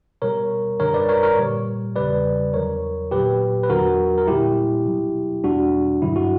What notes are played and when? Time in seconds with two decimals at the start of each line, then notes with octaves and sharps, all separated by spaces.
0.22 B2 G3 A#4 C#5
0.80 F#2 D3 G3 A#4 C#5
0.94 B4 D5
1.09 A#4 C#5
1.23 A#4 C#5
1.38 A#2 G3
1.96 E2 C#3 G3 B4 D5
2.54 E2 D3 F#3 A#4 C#5
3.11 A#2 F#3 G4 B4
3.63 B4
3.70 E2 D3 F#3 F#4 A#4
4.18 A#4
4.27 A#2 G3 E4 G4
4.86 B2 F#3
5.44 E2 B2 G3 D4 F#4
6.02 G2 D3 F#3 E4
6.16 F#4